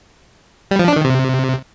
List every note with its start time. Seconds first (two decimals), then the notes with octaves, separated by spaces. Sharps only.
0.71 G3
0.79 F3
0.88 D4
0.96 D#3
1.05 C3